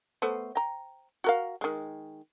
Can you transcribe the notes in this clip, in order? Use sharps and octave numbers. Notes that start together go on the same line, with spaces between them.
A3 B3 C5
G5 A#5
F#4 A#4 F5
D#3 G#3